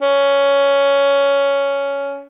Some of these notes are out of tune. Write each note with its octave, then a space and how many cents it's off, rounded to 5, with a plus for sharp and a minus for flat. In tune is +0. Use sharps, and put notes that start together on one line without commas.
C#4 +10